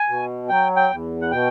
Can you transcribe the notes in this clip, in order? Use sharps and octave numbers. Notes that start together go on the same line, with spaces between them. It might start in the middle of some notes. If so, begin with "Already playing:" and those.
Already playing: G#5
B2
F#3 G5
G5
E2
F#5
B2 G5